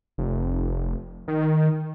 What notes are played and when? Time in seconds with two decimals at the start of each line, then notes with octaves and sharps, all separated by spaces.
0.18 F1
1.28 D#3